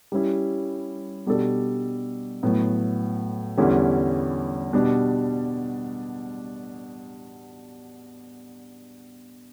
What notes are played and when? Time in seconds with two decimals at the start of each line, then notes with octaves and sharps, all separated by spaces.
0.12 G3 C#4 E4
1.27 B2 G3 D4 A4 D5
2.43 A2 F#3 B3
3.57 E2 D3 G3 C#4 E4
4.73 B2 G3 D4